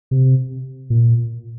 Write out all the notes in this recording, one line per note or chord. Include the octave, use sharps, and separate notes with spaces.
C3
A#2